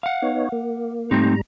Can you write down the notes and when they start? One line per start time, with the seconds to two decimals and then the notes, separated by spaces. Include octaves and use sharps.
0.03 F5 F#5
0.22 B3 D#4 C#5
0.52 A#3
1.11 G#2 G3 A3 C4 D#4 A#5